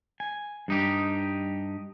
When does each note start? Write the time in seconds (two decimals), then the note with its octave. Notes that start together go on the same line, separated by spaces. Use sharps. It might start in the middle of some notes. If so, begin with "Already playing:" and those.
0.20 G#5
0.68 G2 D#4 G4